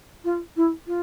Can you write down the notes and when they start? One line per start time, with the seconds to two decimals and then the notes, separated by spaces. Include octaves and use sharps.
0.24 F4
0.56 E4
0.87 F4